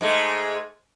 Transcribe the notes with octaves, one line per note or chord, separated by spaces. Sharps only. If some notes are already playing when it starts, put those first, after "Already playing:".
G#2 G#3 A3